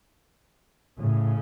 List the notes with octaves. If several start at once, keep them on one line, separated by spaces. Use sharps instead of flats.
A2 C#3